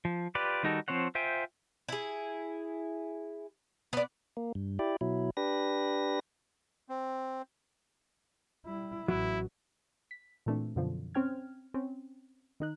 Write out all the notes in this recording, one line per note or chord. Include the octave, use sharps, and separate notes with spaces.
F3
F4 G4 B4 D5
D#3 G3 D#4 F#4 A4
F3 C4 C5 C#5 F#5
F4 C5 E5 G5 G#5
E4 G#4
B3 D5
A#3
G2
E4 G4 D5
B2 F#3 E4
D4 G4 B4 A#6
C4
G3 E4
A1 F#3 E4
B6
A#2 E3 A3 C4 D4
F#2 B2 D3 F3
C4 C#4 G5 F6 G#6
C4 C#4
D#3 D#4 F#6